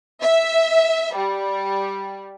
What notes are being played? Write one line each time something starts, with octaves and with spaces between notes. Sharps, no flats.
E5
G3